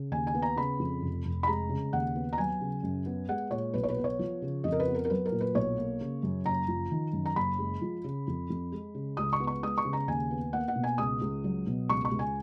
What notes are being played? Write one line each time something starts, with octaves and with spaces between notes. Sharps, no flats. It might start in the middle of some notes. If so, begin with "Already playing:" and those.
Already playing: C#3
D#2 G#5
G#5
B3
A#5
C#3 B5
F2
F1
F1
B5
G#3 A#5
C#3
D#2 F#5
B3
A#5
F#3 G#5
C#3
F#2
B3
G#3 F#5
A#2 C#5
B1 B4
C#5
B4
B3
C#5
F3
C#3
F2 D#5
A#4
B4
B3
A#4
A#4
F#3 B4
A#4
A#2
B4
B1 C#5
A#3
C#3
F#2
F#1 A#5
F3
D#3
F#2
A#5
F#1 B5
G#3
F3
C#3
F2
F2
G#3
C#3
C#2 D#6
C#6
B3
C#6
G#3 D#6
C#6
C#3
A#5
D#2 G#5
B3
A#3 F#5
F#5
B2
G#5
C#2 D#6
C#2
F#3
B2
C#2 C#6
C#6
C#2
G#5